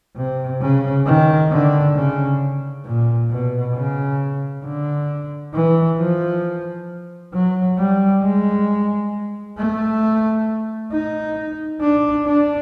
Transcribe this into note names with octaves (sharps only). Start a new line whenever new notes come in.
C3
C#3
D#3
D3
C#3
A#2
B2
C#3
D3
E3
F3
F#3
G3
G#3
A3
D#4
D4
D4